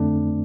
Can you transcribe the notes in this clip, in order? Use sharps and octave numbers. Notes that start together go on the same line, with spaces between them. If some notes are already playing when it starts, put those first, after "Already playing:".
Already playing: F2 D3 A3 C4 D4